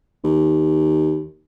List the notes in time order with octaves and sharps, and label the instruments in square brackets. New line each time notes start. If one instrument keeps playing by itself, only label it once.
[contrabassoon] D#2